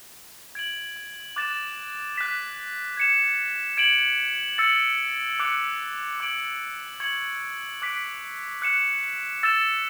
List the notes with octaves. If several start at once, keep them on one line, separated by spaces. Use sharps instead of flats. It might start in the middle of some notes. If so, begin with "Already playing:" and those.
G#6 D7 F#7
D6 F#6 A6 E7
F#6 B6 E7
G#6 C#7 E7
G#6 D7 F#7
E6 A6 C#7 F#7
D6 F#6 C#7
D6 G#6 D7 F#7
C#6 G#6 C#7 F#7
D6 F#6 B6 D7
F#6 C#7 E7
E6 A6 E7